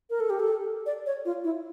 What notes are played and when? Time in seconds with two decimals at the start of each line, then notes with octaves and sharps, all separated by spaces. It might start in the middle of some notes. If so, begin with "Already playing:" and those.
0.10 A#4
0.20 A4
0.30 G4
0.40 A4
0.86 D5
1.06 C#5
1.25 F4
1.44 E4